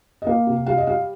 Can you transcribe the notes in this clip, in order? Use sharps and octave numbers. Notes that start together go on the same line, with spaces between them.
D#5
A#3 F5
C3
G3 F5
D#5
G3 F5